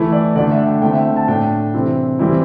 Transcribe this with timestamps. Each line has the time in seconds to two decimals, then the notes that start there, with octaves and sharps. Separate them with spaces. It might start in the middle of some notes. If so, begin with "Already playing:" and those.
Already playing: E3 A3 E4
0.12 D5
0.35 D3 D5
0.38 A3 D4
0.51 E5
0.66 G5
0.82 D3 A3 C4 E4 G5
0.93 E5
1.05 G5
1.16 A5
1.27 A2 A3 D4 G5
1.74 C3 E3 C4 E4
2.19 E3 G3 C4 E4